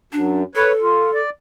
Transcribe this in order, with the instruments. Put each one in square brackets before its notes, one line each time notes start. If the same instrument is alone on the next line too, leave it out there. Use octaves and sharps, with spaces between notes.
[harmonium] F#2 [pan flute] D4
[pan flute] A4 [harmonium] B4 C#5
[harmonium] F4
D5